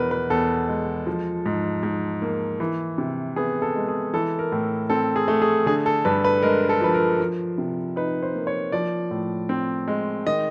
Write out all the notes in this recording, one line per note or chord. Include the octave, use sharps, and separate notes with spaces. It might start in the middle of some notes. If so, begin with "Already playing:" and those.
Already playing: E2 B2 A#4 B4
B4
E2 A4
G#3
F3
G#2
G#2
A#3
E3
C3
B3 G#4
A4
G#3
G#4
E3 A4
A#4
A2
C4 A4
G#4
A3
G#4
D3 G#4
A4
G2 B4
B4
G#3 A#4
A4
F3 B4
A#4
F3
C3
D#4 B4
C5
A#3
C#5
F3 D5
A2
C4
G#3
D#3 D#5